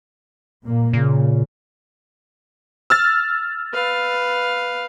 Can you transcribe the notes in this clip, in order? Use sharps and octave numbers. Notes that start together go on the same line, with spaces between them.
A#2 A#3
A#2 C#3
E6 F6 A6
B4 F5